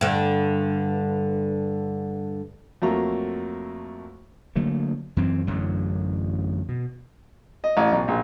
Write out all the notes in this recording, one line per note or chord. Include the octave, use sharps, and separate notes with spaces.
G2 D3
F2 F#3 A3 A#3 A#5
D3 F#3 A3 A#3
F#2 E3 C4
A1 F#2 D3 F#3
B2
D#5
A1
B1
A#1